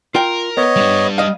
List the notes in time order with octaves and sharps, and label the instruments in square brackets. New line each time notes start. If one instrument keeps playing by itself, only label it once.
[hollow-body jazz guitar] F4 G5 [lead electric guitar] A#4
[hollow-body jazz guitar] B3 [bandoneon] C#5 D#5
[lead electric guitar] G3 D4
[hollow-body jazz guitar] D#5 F5